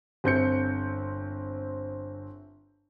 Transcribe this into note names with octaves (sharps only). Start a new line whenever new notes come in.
G1 C4 G6 C#7